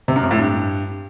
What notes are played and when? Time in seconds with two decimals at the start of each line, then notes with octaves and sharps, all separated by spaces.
0.08 C3
0.16 F#2
0.23 F2
0.31 A2
0.38 G2